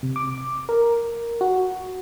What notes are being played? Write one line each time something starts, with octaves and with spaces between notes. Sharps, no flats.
C3
D6
A#4
F#4